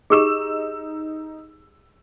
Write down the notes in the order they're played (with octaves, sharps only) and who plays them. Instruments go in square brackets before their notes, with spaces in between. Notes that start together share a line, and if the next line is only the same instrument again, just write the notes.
[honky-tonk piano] D#4 E6 E7 [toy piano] G4 G#4